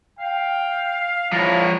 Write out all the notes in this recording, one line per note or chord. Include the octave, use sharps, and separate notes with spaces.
F5 G5
F3 E4 C#5 A#5